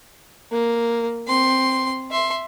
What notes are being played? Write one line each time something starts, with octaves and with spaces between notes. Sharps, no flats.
A#3
C4 C6
E5 C6